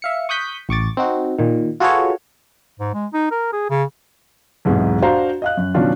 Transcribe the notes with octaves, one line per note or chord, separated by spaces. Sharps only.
E5 F5 C#7
C#6 D#6 F#6 G6 B6
A1 C#6 D6 A6
C4 D#4 F#4
A#2 D#3
F4 F#4 G#4 A4 B4 C#5
G#2
G#3
D#4
A#4
G#4
C#3
B1 E2 G#2 C3
D4 F#4 C5 F5 A#5
D#5 F5 F#6
F#2
B2 D#3 F#3 C#4 D4 F4